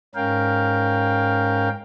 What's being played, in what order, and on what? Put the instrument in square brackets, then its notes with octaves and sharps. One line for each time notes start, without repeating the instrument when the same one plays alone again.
[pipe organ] G#2 C#4 A#4 F5 G5